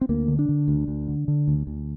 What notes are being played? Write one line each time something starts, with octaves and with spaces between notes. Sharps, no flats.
C4
D2 A#3
D3
D4
D3
D2
D2
D3
D3
D2
D2